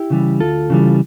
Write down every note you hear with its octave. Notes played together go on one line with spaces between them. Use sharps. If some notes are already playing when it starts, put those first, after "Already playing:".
Already playing: E4 G4
C#3 E3 G3
D2 F4 A4
C#3 E3 G3